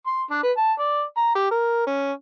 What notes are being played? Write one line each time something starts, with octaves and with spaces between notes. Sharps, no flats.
C6
D4
B4
A5
D5
A#5
G4
A#4
C#4